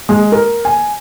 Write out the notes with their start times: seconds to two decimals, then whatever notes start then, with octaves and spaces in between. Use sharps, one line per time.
0.09 G#3
0.32 A#4
0.65 G#5